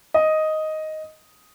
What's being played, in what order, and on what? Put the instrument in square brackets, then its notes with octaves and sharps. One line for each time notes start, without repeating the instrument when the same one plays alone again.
[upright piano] D#5